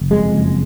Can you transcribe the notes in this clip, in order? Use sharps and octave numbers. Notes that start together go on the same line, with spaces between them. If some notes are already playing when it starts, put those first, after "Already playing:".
Already playing: F#1
F2 G#3
F#1